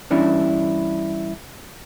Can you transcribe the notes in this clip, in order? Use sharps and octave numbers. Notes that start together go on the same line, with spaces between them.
G2 E3 C#4 D4 E4